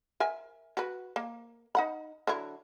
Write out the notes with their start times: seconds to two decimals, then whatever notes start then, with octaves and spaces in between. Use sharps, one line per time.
0.20 A#4 E5 G#5
0.77 F#4 B4
1.16 A#3
1.75 D#4 F#5 B5
2.27 D3 F#3 E4